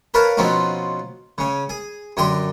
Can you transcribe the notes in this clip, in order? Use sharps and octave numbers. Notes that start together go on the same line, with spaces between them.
A#4 B4 C#5 F5 A5
B2 F3 C4 C#4 D#4 F#4
C#3 C#4
G#4
F#2 D3 G4 A#5 C6